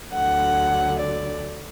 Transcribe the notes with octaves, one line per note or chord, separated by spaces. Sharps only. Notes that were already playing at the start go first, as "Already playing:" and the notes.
D2 D3 F#3 F#5
D5